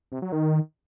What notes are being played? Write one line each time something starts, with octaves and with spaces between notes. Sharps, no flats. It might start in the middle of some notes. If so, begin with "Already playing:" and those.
C3
F#3
D#3